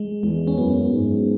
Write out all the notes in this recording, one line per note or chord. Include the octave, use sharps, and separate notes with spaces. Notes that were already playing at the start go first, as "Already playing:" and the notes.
Already playing: G#3
E2 G#3
C#4
F#2 B3
G#2